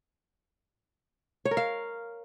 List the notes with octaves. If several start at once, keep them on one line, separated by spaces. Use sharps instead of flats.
C#5
A#4
F5